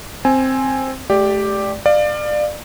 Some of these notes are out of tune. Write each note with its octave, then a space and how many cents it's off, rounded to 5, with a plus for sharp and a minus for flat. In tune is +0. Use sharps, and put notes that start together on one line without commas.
C4 +5 G#5 +5
A3 -35 G4 +0 D5 +0
D5 +25 F5 +0